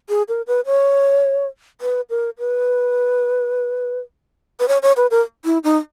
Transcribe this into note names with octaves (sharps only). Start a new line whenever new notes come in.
G#4
A#4
B4
C#5
B4
A#4
B4
B4
C#5
C#5
B4
A#4
E4
D#4